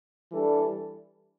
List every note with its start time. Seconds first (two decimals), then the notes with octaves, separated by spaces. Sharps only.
0.32 E3 G3 D4 A4